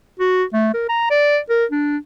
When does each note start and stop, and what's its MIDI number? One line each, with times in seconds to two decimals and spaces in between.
0.20 0.44 66
0.53 0.71 57
0.74 0.86 70
0.89 1.06 82
1.10 1.39 74
1.50 1.65 70
1.71 1.97 62